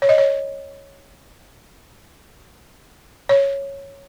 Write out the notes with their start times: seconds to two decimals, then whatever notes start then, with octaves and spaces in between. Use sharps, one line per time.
0.02 C#5
0.09 D#5
0.18 C#5
3.29 C#5